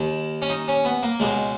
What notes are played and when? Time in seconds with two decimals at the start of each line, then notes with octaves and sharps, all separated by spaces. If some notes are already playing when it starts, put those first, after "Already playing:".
Already playing: D#2 D#3
0.42 C#4
0.50 D#4
0.68 C#4
0.85 B3
1.03 A#3
1.20 C#2 B2 G#3